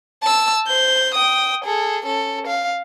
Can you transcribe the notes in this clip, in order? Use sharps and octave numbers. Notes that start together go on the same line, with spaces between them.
A5 E6
C5 G6
G5 D#6
G#4 A4
C#4 A4
F5